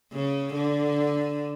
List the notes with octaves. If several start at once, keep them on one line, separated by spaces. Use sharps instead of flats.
C#3
D3